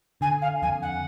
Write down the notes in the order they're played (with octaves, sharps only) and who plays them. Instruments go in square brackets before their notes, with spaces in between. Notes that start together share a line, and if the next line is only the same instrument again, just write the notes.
[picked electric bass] D3 [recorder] G#5
[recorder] F5
[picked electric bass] F2 [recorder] G#5
[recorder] F#5